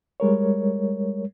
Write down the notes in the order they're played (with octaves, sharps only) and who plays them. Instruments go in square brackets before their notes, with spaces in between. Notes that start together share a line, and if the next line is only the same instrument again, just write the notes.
[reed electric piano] G3 G#3 A#4 C#5